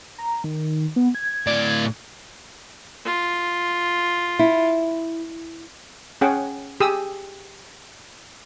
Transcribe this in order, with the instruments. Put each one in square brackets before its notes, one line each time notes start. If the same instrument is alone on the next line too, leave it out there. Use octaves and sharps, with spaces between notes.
[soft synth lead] A#5
D#3
B3
G#6
[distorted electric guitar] A2 D5
[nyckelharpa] F4
[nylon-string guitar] E4
[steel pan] C#4 G#4 F#5 G5
G4 G#4 D#6 E6